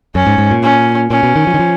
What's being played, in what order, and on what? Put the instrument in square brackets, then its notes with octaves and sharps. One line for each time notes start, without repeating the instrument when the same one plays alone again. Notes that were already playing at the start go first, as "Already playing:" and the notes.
[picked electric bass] F#2 [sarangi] C#4
[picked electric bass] G#2
G#2
A#2
[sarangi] C#4
[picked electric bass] A#2 [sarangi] C#4
[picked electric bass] B2
D#3
F3
D#3
F3